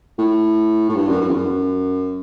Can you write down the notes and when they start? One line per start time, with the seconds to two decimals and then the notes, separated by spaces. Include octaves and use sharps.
0.18 A2
0.89 A2
0.96 G2
1.08 F#2
1.21 F#2
1.29 E2
1.34 F#2